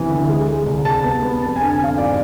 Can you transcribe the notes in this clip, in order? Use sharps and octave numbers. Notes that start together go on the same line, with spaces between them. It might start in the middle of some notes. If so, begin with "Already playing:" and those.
Already playing: C3 E3 B3
D2
G#3
G#3
C2
C2 A5
B3
B3
F2 A5
D3 G#5
G#5
F2 F5
G#2 D5